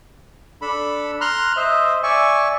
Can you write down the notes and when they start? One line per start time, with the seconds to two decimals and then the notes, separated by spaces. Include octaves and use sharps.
0.62 D4 A4 B5
1.21 A#5 C6 F6 F#6
1.57 C5 D#5 E5
2.03 D5 E5 G#5 C#6